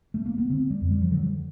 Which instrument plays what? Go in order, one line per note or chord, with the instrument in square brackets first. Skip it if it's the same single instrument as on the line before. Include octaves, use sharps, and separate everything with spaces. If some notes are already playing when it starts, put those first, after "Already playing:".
[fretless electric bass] A3
A#3
B3
D3 C4
G3
F2
G3
F3
D3 F#3